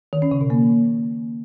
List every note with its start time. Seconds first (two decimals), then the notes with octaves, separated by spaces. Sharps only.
0.13 D#3
0.22 C#4
0.31 C#3
0.41 B2
0.50 A#3